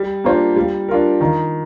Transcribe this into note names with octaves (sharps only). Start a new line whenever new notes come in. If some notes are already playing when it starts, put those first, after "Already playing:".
Already playing: G3
A#3 D4 F4 C5
G3
D4 F4 A#4
D#3